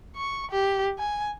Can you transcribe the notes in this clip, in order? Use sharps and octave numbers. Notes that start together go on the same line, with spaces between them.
C#6
G4
G#5